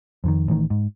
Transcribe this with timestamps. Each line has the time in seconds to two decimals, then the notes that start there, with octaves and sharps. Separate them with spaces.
0.24 F2 D3 D#3
0.48 A1 A2 D#3
0.70 G#2